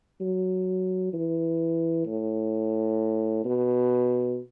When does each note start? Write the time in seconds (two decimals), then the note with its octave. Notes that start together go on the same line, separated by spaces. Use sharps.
0.21 F#3
1.13 E3
2.06 A2
3.45 B2